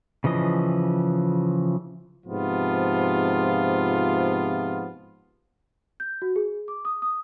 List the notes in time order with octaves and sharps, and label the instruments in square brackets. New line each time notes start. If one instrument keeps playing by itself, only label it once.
[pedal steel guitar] C#3 E3 F3 D#5
[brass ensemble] G#2 C3 F3 B3 F4
[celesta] G6
F#4
G#4
D6
D#6
D#6